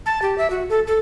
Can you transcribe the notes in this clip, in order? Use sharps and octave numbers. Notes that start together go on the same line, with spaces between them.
A5
G4
E5
F#4
A4
A4